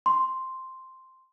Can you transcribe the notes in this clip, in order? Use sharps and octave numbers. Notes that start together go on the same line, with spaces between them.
C6